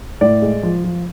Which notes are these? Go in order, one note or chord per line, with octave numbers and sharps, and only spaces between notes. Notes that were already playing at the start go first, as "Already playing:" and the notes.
A2 D5
G#3
F3
F3